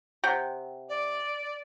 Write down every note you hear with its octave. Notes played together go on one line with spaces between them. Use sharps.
C3 F#5 G5
D5